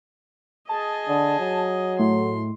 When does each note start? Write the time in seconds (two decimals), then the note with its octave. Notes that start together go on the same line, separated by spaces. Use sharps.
0.69 G#4 D#5 A5
1.07 D3
1.39 F#3
1.99 A2 C6